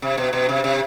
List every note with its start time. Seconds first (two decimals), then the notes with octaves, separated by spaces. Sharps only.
0.02 C3
0.18 B2
0.33 B2
0.49 C3
0.64 C3